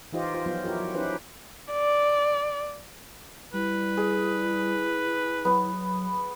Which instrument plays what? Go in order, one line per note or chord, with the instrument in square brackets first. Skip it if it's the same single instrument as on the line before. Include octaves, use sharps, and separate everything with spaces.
[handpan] E3 D#4 F4 G4 C5 D#5
F4 C5
F3 F#3 B3 F4
E4 F#4 G4 A#4
F#3
C#4 D#4 E4 G4 B4 C5
[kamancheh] D5
[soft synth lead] G3 [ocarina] E4 [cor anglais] B4
[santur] G#4
[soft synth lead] F#3 [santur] B3